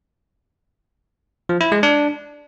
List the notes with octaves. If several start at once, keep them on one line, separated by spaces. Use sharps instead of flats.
F3
E4
G#3
D4